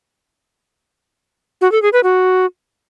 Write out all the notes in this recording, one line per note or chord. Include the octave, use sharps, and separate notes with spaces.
F#4
A4
G#4
B4
F#4